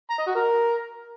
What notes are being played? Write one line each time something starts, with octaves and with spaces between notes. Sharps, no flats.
A#5
D#5
F#4
A#4